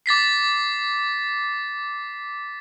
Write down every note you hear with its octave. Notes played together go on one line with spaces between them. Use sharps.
D6 A6 B6 C7